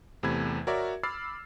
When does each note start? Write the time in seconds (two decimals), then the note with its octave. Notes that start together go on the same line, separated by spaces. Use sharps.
0.23 E2 C3 A3 B5 G#6
0.67 F#4 A#4 C#5 D5 E5
1.03 B5 D6 E6 F6 A6 C7